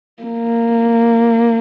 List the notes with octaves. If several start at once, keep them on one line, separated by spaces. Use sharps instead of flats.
A#3